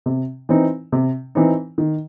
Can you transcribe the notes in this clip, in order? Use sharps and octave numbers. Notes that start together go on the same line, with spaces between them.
C3
E3 C4 D#4
C3
E3 C4 D#4
D#3